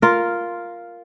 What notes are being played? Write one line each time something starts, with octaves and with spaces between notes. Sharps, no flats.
F4 A#4